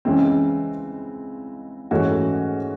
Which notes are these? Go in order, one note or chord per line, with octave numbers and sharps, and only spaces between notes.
C#2 C#3 E3 G#3 C4
G#2 E3 A3 C#4 F#4